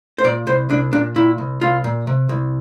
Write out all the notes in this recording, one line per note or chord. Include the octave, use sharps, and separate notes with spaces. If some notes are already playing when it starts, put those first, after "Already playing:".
C5
A#2 D5
C2 C5
C2 D4
A#2 D4
A#2 E4
C2
C2 F4
A#2
C3
C2